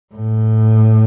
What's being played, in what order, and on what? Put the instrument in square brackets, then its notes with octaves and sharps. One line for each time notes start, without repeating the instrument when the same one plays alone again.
[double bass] A2